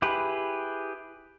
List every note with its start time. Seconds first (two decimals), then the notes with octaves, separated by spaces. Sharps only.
0.02 E4 G4 G#4 B4